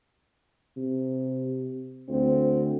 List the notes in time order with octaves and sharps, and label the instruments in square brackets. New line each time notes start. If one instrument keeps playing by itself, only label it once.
[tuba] C3
[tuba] D2 [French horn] C4